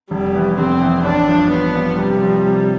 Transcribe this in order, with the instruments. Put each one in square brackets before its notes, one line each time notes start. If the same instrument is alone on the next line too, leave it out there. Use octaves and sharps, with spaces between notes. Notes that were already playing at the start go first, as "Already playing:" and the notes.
[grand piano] F1 [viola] G3
[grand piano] F2 E3 B3
[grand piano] F1 [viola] C4
[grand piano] F2 E3 B3
[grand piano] A1 [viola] D4
[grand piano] G2 F3
[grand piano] A1 [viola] B3
[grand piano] G2 F3
[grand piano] C3 [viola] G3
[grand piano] F3 C4
C3